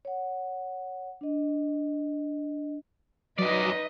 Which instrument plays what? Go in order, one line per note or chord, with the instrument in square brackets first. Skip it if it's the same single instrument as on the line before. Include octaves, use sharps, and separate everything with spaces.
[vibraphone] C#5 F#5
D4 D#5
[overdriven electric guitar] F#2 D5 [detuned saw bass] F#3 [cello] D#4 B4 [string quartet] D#5